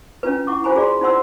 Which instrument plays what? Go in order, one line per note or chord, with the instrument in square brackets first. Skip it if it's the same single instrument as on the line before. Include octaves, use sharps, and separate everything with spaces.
[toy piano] C#4 D4 F4 B4
E4 F#5 C#6 D6
F4 F#4 C5 G#5 A#5 B5
G#4 D5 F5 C6
D#4 F4 C5 F#5 C6 E6